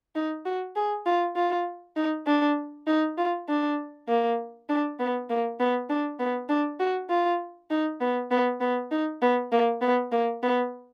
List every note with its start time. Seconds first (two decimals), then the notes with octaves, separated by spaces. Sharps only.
0.16 D#4
0.46 F#4
0.76 G#4
1.07 F4
1.36 F4
1.97 D#4
2.27 D4
2.87 D#4
3.18 F4
3.49 D4
4.09 A#3
4.69 D4
5.00 B3
5.30 A#3
5.60 B3
5.90 D4
6.20 B3
6.49 D4
6.80 F#4
7.10 F4
7.71 D#4
8.01 B3
8.31 B3
8.61 B3
8.92 D#4
9.22 B3
9.53 A#3
9.82 B3
10.12 A#3
10.43 B3